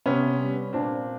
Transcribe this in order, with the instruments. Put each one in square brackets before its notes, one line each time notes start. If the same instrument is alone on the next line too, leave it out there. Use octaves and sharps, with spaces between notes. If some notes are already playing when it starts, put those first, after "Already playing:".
[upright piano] C3 B3 C#4
G3
A#2 C4 D4